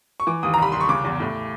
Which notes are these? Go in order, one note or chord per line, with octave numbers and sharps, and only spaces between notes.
C#6
E3 D6
D#2 D#6
A#5
C2 B5
C2 C6
C#6
C#3 D6
E2
A2